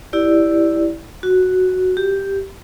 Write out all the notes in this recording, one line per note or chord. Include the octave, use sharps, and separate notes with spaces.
E4 G4 D5
F#4
G4